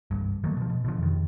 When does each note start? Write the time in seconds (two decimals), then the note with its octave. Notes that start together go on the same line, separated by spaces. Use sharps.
0.11 G1 C2 G2
0.44 D#3 F#3 A3 A#3
0.57 B2 F3
0.69 B2
0.84 B2 D3 F3
0.99 F2 D#3